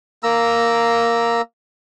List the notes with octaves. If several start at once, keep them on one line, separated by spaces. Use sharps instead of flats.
A#3 A#5 E6